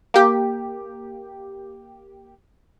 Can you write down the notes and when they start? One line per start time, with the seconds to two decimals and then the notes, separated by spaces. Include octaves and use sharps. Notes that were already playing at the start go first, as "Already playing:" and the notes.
0.14 A#3 G4